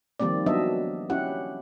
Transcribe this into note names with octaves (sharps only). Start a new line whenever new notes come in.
D#3 F3 G3 A#3 C4 D5
F#3 B3 D4 D#5 E5
C#4 E4 G4 F#5